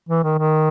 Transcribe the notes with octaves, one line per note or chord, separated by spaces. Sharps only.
E3
D#3
D#3